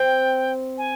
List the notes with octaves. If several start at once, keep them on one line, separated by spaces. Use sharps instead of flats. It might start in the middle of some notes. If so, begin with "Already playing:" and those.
Already playing: C4 G5
G#5